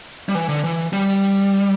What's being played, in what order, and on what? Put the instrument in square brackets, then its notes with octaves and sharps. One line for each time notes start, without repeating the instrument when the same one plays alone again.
[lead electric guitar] G3
E3
D3
E3
G3